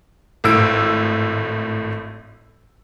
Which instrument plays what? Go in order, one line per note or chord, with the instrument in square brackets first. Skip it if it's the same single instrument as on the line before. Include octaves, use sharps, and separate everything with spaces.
[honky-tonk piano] G#1 A2 E6 D7